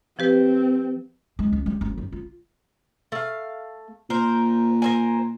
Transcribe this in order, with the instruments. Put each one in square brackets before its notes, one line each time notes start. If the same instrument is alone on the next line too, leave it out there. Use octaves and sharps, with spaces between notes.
[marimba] F3 G4 B4 [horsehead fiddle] C4
[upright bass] G#3
C#2
G3
F#1
D#3
F4
[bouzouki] A3 F5
[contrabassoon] A#2 [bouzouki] A#4 C5
[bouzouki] A#4 C5 G#5